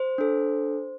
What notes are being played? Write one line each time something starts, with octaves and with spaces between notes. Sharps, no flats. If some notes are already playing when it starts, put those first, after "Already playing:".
Already playing: C5
D4 A4